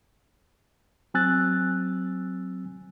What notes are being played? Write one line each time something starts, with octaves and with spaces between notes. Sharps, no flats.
F#3 C4 G#5 E6 F#6 A6